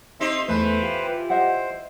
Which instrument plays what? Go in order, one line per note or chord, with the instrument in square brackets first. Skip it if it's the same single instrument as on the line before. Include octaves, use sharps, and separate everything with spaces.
[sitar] C4 D#4 G4 [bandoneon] D#5 E5 C6
[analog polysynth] E2 A3 [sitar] E3 [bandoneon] B4 C5
[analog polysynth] F4 G4
[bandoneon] C5 [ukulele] D#5 E5 F#5